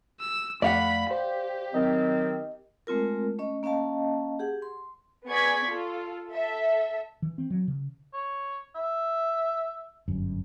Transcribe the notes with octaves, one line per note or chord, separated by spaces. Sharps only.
E6
F2 A3 D5 F5 F#5 B5
G4 C5
D#3 F#3 C4 D#5
G#3 A3 C4 F4 A#4
A3 C#4 D#5
A#3 C#4 D#5 F5 A5
G4 G#4 F#5
C6
B3 G#4 D5 C#6 G#6 B6
F4 A4
A4 E5
E3
C4
F#3
C#3
C#5
E5
G1 F#2